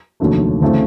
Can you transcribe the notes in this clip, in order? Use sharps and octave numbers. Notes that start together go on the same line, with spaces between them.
F1 D#2 D3 F#3 A3
D2 C#3 E3 A3 C4